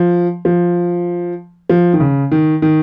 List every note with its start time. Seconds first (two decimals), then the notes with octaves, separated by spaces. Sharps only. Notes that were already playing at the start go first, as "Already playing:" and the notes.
Already playing: F3
0.45 F3
1.69 F3
1.93 D#3
2.00 C#3
2.32 D#3
2.62 D#3